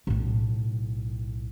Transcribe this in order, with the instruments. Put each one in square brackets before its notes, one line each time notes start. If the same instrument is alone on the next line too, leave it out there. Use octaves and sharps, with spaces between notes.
[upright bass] B1 A2